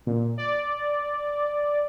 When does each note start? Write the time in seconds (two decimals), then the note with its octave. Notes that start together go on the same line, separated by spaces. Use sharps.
0.07 A#2
0.38 D5